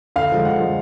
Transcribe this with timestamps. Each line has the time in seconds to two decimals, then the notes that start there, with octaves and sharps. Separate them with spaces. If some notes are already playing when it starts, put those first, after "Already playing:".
0.16 D2 F5
0.31 D3 F3 G#3
0.45 D2 F#5
0.60 D3 F3 G#3